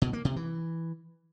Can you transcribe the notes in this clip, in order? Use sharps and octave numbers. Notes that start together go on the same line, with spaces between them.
B2
A#3
C3
E3